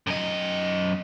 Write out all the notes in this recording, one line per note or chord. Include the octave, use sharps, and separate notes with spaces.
F#2 D#5